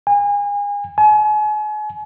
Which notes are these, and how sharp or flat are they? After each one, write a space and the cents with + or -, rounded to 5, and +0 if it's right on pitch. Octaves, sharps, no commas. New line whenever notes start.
G#5 -30
G#5 +40